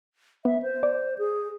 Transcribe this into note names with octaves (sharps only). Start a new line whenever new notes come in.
B3 E5
C5
D5
G#4